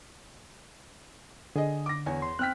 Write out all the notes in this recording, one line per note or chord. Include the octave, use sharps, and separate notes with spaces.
D3 G#4 D#5
D6 A#6
E2 C#5 G#5
C6
C4 G5 F6 F#6 B6